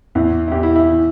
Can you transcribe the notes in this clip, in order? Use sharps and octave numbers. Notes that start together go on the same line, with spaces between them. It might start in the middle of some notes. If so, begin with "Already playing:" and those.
E2 E3 E4
E4
E2 E3 G4
E4
E4
E3